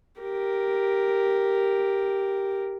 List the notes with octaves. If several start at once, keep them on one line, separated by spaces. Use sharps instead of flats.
G4 A#4